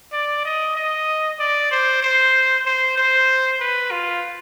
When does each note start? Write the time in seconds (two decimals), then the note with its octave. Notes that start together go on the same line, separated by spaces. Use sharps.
0.13 D5
0.45 D#5
0.76 D#5
1.39 D5
1.71 C5
2.03 C5
2.66 C5
2.98 C5
3.60 B4
3.91 F4